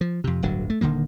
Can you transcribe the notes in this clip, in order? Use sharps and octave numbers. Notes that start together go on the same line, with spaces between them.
F3
F2 C3
D1 G1 D3 F#3
A3
D#1 D3 D#3 A#3